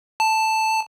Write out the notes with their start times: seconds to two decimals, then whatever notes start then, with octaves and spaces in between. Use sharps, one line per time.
0.20 A5